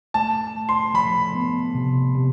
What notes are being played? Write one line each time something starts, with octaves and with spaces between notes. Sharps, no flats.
A3 A5
A3
C6
F3 B5
B3
C3
C3